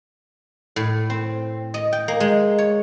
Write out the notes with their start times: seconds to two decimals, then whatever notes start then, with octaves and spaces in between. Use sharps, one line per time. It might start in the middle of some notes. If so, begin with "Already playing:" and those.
0.76 A2
1.10 C4
1.74 D#5
1.93 G5
2.08 A#3
2.20 G#3
2.58 C#5